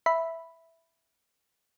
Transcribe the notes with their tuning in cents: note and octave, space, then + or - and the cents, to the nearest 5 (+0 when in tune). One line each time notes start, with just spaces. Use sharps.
E5 +0 B5 +0